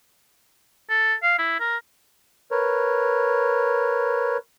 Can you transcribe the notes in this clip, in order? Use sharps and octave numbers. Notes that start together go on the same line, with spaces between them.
A4
F5
E4
A#4
A#4 B4 C#5